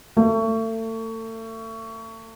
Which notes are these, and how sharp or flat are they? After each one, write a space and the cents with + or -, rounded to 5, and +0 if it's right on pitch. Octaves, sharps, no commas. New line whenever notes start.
A3 +35